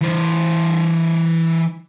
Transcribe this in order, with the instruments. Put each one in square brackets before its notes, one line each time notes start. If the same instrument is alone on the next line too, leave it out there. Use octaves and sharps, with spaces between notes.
[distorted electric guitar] E3 C5